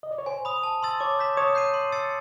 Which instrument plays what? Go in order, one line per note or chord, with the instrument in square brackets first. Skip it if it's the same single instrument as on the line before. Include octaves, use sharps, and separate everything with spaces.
[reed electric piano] D#5
D5
C#5
[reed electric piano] C5 [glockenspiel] G#5
[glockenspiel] B5 D#6
A5
C6 E6 A6
[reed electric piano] C#5 [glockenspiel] D6
[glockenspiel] G6 B6 E7
[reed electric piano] C#5 [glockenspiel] D#6
[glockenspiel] G6 C7 D#7
C6
E6 A6 C#7